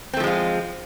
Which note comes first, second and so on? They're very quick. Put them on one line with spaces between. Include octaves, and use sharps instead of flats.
C4 A3 F3 G#3 F4